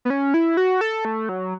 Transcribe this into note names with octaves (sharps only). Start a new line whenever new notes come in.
B3
C#4
E4
F#4
A4
A3
F#3